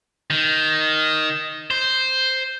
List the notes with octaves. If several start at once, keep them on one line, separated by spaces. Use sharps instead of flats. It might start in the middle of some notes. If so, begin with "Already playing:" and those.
D#3
C5